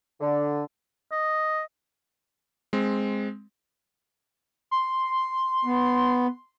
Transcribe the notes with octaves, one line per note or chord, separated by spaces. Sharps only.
D3
D#5
G#3 C4
C6
B3